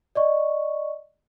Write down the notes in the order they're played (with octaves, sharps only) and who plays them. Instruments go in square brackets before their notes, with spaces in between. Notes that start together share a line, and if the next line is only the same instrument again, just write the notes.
[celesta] D5 D#5 C#6